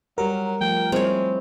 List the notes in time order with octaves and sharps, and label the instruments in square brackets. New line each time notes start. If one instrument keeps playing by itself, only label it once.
[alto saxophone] F#3 [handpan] G3 G4 [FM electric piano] A#4
[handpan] F3 A3 [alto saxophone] G5
[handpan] G3 E4 [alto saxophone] G#3 [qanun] C4 C#5